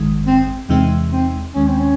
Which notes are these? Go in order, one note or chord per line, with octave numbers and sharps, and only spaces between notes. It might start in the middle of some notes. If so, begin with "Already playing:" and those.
Already playing: G#1 F#2 D#3 G#3
C4
E2 C3 E3 G#3 C4 D#4
C4
D#2 D#3 G#3 C#4
C4
C#4